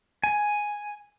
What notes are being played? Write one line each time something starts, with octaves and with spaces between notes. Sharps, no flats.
G#5